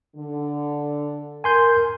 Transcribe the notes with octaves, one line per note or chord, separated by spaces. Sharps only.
D3
A#4 G#5 C6 G6